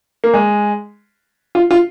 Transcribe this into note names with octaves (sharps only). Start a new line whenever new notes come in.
A#3
G#3
F4
F4